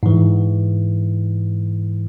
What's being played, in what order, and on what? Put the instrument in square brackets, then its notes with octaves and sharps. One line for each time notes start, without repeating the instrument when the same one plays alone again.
[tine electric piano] G#2 E3